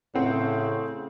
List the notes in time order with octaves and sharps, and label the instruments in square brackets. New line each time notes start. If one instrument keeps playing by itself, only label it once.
[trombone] A2 [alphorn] C#3 [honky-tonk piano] C4 F#5